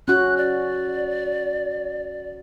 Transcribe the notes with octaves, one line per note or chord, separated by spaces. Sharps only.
C#4 F#4 F#6
D5